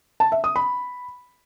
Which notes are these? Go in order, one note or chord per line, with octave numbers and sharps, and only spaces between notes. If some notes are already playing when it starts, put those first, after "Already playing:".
A5
E5
D#6
B5